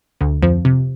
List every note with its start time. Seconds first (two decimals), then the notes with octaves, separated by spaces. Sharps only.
0.21 D2 D3
0.43 F2 F3
0.65 C3